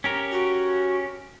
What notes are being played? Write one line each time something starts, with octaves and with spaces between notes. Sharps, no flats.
C#4 G4 A#4
F#4